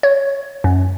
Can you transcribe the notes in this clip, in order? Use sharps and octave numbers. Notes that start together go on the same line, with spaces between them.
C#5
F#2